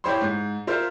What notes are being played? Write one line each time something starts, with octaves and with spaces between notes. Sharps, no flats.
E4 G4 C5 C#5 B5 C6
G#2
F4 A#4 C5 E5 F5